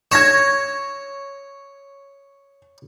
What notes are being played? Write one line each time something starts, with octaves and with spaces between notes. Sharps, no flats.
C#5 G#6 A#6 E7